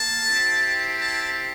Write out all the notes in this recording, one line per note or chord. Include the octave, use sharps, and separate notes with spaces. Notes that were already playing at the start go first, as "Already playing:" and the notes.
Already playing: A#3 A5
C4 E4 G4
A5